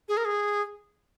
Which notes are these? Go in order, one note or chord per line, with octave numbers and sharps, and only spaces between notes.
G#4
A#4
G#4